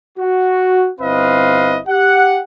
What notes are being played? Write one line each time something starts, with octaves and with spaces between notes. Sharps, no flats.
F#4
G1 C4 E4 B4 D#5 F5
G4 F#5